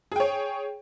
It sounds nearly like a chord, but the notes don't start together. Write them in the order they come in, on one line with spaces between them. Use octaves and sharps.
G#4 G5 C#5